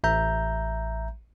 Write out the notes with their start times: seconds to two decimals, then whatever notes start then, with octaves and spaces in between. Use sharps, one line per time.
0.04 A1 E5 A#5 G6